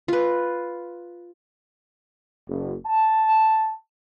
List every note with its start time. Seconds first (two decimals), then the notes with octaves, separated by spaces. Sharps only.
0.08 F4 B4
2.49 F#1
2.86 A5